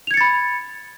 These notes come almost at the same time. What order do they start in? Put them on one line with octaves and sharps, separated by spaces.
F7 G#6 C#7 A6 B5